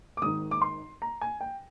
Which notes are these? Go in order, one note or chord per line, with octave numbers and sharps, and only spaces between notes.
D6
G#1 G#2 D#3 D#6
D6
C6
A#5
G#5
G5